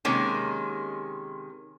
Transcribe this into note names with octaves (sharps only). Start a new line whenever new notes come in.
C3 D#3 G#3 A#3 C#4